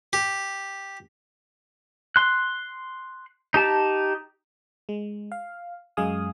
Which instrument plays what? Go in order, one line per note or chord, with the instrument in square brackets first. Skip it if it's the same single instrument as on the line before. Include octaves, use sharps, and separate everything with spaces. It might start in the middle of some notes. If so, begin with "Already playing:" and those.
[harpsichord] G4
[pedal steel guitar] C6 F#6
D#4 G4 A5
[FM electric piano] G#3
F5
F#2 G#3 F5 G#5 D#6